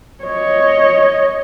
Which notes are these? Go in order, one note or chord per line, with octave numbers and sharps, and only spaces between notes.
C#5 D#5